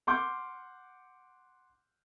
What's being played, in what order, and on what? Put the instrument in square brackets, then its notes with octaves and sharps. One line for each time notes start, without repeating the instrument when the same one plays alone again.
[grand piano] F#5 C6 D6 F6 G6